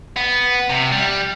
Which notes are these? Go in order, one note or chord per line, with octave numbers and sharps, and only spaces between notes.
B3
C3
G3